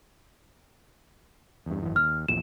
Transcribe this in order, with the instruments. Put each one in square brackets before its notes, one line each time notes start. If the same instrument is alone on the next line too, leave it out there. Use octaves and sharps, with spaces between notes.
[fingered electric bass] E2 G2
G#1 F#2 E3
[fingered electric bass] D#2 [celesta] F6
[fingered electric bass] A#1 E2 A#2 [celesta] E7